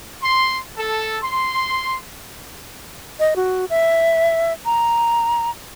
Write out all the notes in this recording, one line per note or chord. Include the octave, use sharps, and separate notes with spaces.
C6
A4
C6
D#5
F#4
E5
A#5